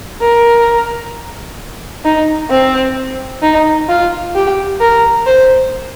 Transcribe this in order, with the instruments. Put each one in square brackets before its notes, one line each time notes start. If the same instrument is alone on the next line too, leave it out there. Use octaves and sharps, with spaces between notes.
[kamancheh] A#4
D#4
C4
D#4
F4
G4
A#4
C5